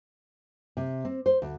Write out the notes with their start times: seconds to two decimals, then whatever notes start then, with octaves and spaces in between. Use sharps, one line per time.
0.77 C3
1.05 C4
1.26 C5
1.42 D2